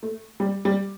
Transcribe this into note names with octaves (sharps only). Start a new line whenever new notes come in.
A3
G3
G3